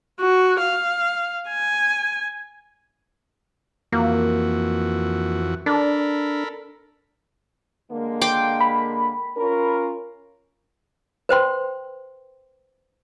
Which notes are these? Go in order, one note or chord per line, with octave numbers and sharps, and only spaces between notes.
F#4
F5
G#5
F2 E3 A#3 F#4
D4 A4 A#4 B5
D3 G#3 A#3
G5 C6 D6
B5
C#4 F4 A#4
B4 C5 G5 C6